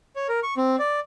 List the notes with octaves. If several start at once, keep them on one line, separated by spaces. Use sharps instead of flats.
C#5
A#4
C#6
C4
D5